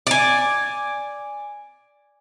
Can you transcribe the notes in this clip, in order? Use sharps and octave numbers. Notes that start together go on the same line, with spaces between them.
D5 G#5